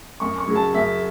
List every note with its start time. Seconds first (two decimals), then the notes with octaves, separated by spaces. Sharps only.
0.20 F#2 C#6
0.38 C#6
0.47 C#3 F#3
0.56 A5
0.74 F#2 E5